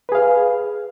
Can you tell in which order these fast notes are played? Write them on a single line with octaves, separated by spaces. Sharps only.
B4 G#4 F5